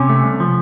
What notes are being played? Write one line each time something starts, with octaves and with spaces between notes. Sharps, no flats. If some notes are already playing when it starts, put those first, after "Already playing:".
Already playing: C3 C#4
A3
C2
F3